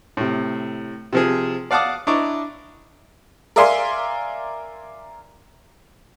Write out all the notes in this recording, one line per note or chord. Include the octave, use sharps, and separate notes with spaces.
A2 C3
C3 F3 G#4
D5 F5 F#5 A5 D6 D#6
D4 E4 D#5 A#5 C#6 D6
A#4 D5 E5 F5 G#5 C6